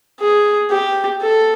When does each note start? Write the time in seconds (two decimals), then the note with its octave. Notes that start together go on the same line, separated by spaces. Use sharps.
0.21 G#4
0.70 G4
1.21 A4